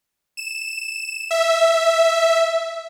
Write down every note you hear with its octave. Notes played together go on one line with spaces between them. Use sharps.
E7
E5